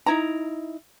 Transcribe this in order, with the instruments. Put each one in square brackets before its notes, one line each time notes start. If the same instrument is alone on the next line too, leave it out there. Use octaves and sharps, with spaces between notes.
[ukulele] D#4 E4 A#5